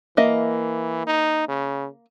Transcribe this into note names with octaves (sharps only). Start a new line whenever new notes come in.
E3 A#3 D#5 E5
D#4
C#3